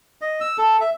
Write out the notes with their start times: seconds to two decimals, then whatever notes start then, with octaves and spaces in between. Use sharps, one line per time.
0.21 D#5
0.41 E6
0.58 A4
0.81 E5